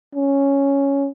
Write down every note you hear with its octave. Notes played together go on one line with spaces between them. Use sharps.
C#4